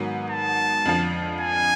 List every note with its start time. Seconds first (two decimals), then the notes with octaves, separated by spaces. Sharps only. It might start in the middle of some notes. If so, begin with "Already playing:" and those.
Already playing: G#2 D#3 F#3 B3
0.31 A5
0.85 F2 D3 F3
1.40 G#5